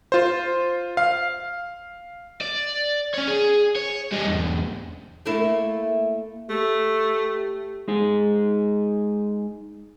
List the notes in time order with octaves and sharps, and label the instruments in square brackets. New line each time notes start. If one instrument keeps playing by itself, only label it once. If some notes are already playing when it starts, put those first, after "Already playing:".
[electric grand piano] F4 C5
F5
[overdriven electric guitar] D5
C#4 C#5
G#4
C#5
G3 D#4
B1 E2
[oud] A3 A#3 E4
[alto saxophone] A3 [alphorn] G4
[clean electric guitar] G#3 D#4 G#4